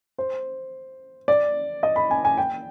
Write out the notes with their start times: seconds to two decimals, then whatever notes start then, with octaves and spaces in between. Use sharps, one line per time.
0.18 C5
1.28 D5
1.83 D#5
1.96 B5
2.11 G#5
2.25 G#5
2.37 G5